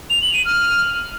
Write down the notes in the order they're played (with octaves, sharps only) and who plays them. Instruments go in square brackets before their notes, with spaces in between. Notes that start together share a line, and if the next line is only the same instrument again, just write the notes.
[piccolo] F7
F#7
D#7
F6